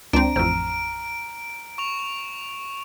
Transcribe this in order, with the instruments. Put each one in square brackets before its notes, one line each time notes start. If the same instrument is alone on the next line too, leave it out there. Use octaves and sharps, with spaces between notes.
[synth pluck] C#2 [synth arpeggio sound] C4 D4 [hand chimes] A#5 [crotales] D7
[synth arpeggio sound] A1 F2 [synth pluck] C5 E6 [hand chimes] A#5 F6
[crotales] C#6 F7